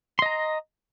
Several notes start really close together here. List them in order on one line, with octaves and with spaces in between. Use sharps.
C6 D#5 A#5